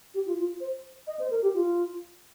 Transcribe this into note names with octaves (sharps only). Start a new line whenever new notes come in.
G4
F4
F4
C5
D#5
C5
A#4
G4
F4